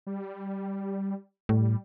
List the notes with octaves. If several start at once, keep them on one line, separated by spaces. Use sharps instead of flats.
G3
A2 G3